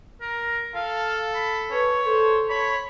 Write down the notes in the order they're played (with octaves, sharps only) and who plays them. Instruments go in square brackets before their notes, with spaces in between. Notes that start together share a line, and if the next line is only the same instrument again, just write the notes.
[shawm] A#4
[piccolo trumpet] A4 [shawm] F5
[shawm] B5
[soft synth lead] B4 [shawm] C#5
[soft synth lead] A4 [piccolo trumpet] C5
[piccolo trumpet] C#5 [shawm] B5